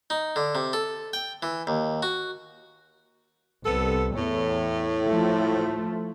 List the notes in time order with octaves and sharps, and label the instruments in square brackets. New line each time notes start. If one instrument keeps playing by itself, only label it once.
[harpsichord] D#4
D3
C3
A4
G5
E3
D#2
F#4
[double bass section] C2 [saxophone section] B3 A4
[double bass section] E2 [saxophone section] A2
[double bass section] F3 A3